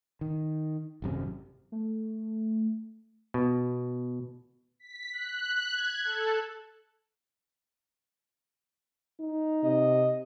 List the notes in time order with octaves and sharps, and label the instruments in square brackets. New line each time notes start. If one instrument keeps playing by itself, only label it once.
[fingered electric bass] D#3
G#1 F#2 C3
[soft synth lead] A3
[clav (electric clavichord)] B2
[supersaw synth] B6
F#6
G#6
A4
[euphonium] D#4
[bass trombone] C3 [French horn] D#5